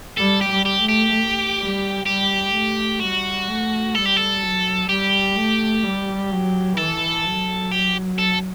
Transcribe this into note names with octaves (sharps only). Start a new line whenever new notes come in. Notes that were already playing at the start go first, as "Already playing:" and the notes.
G3 A4
G4
G3
G4
A3
G4
G3
G3 G4
A3
G3 F#4
A3
G3 A4
G4
A4
F#3
G3 G4
A3
G3
F#3
E3 A4
F#3
G4
A4